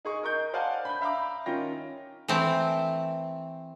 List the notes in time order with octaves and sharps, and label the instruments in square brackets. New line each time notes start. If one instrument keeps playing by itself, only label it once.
[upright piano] D#4 G#4 C#6
A#4 D#5 C#6 G6
C5 D5 F5 F#5 G#5 A5
B5 G6
E5 F5 A#5 B5 D6
D#3 C#4 F4 G5 A#6
[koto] E3 A3 C4